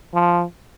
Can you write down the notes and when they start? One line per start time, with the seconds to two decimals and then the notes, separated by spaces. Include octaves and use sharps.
0.14 F3